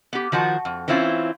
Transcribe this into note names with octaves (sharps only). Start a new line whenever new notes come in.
B3 G4
D#3 F3 F#4 A5
F2
E3 C4 C#4 E4 F4